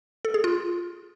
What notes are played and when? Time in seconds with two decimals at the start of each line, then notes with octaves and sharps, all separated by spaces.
0.25 A4
0.34 G#4
0.44 F4